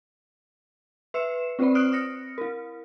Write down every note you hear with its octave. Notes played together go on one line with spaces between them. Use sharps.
B4 E5 E6 C7 C#7 E7
C4 F4 B4 C5 D5 B5
D#6 F6 F#6 C7 D7
D#6 F6 A#6 C#7
E4 A#4